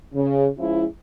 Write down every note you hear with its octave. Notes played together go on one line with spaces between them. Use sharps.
C#3
F3 G#3 C#4 E4